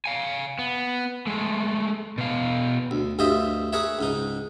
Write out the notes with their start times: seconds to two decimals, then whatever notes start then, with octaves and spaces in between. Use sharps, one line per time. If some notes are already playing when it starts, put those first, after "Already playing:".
0.05 F5 G#5
0.59 B3
1.27 G#3 A3
2.18 B2 F5
2.91 D2
3.19 D2 G2 F4 C5 D#5 E5
3.73 G#4 A#4 B4 C#5 E5
3.99 C#2 G#2 D#4